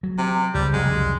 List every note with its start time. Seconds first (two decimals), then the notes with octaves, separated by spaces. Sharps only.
0.03 F#3
0.18 C3
0.54 C#2 G3
0.73 C2 F2 F#3 G#3